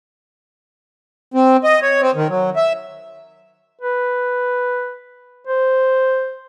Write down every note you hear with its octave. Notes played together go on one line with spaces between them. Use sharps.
C4
D#5
C#5
C4
D#3
F#3
E5
B4
C5